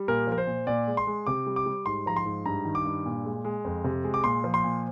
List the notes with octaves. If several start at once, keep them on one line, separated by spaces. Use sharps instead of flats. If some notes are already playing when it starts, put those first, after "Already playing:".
Already playing: G3
A#2 A#4
F3 A#4
C5
A#2
A#2 D5
G#3
C6
G#3
C3 D6
G3
D6
G3
G#2 C6
F3 A#5
C6
G#2
G2 A#5
D#3
D6
G2
A#2
G#3
G#3
F2
C3
G#3
D6
A#2 C6
F3
C6
A#2